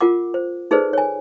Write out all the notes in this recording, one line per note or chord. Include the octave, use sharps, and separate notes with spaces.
F4 A#4 F#5 D6
C5
D#4 G#4 A4 B4 C5 D5
C#5 G#5